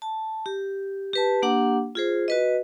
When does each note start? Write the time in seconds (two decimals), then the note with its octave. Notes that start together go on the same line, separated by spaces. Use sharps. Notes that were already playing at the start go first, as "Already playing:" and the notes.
0.02 A5
0.46 G4
1.13 G4 B4 A5
1.42 A#3 D4 G4 F#5 D6
1.95 F4 G#4 C5
2.28 F#4 B4 D#5